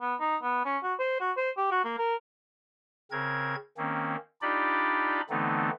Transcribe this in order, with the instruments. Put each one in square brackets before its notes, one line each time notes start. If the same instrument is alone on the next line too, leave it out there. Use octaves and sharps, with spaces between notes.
[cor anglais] B3
D#4
B3
C#4
F#4
C5
F#4
C5
G4
F#4
A#3
A#4
[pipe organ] C#3 C4 A#4 G#6
D#3 A#3 C4 C#4
D4 D#4 F4 G4 D5 B5
D3 E3 A3 B3 C4 D#4